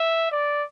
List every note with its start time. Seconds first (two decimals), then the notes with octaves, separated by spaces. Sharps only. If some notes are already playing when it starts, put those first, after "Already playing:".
Already playing: E5
0.31 D5